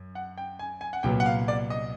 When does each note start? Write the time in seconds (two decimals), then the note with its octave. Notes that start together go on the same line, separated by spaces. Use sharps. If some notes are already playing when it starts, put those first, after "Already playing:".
Already playing: F#2
0.15 F#5
0.38 G5
0.59 G#5
0.81 G#5
0.93 F#5
1.03 C2 A#2 F#3 B3 G5
1.20 F#5
1.26 F5
1.48 D5
1.70 D#5